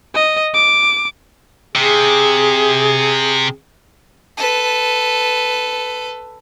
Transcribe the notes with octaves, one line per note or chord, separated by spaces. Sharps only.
D#5
D6
C3 G#4
A4 B4